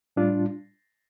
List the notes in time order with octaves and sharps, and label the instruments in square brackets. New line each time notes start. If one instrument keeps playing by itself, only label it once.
[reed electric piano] A2 G3 D4 F4